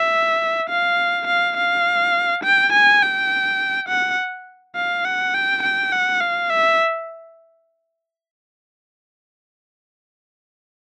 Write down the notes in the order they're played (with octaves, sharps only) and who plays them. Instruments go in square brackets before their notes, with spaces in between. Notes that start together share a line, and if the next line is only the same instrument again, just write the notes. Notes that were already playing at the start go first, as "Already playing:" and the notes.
Already playing: [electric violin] E5
F5
F5
F5
G5
G#5
G5
F#5
F5
F#5
G5
G5
F#5
F5
E5